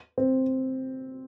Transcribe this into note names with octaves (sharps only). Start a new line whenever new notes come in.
C4